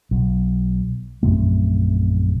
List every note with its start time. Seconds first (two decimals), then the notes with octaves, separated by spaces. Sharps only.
0.11 B1
1.23 A#1 F#2 C3 A3